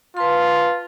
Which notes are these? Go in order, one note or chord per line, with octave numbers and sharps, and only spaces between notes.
F4 B4 A5 C6